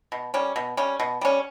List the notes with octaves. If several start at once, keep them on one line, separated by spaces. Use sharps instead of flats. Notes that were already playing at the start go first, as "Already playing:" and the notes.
B2
G3 C#4
B2
G3 C#4
B2
G3 C#4